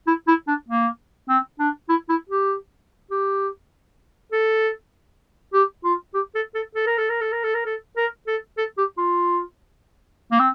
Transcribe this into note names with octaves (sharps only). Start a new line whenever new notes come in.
E4
E4
D4
A#3
C4
D4
E4
E4
G4
G4
A4
G4
F4
G4
A4
A4
A4
A#4
A4
A#4
A4
A#4
A4
A#4
A4
A#4
A4
A4
G4
F4
A#3
C4